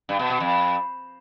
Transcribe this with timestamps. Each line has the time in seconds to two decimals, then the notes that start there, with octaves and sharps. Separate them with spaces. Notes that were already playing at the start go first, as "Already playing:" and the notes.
0.09 G2
0.19 B2
0.30 B2
0.40 F2